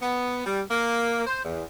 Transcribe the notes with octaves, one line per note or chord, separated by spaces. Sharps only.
B3
G3
A#3
C5
E2